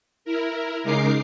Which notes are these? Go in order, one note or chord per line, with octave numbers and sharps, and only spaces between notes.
E4 A#4
C#3 G#3 D#4 A#4 D6 C7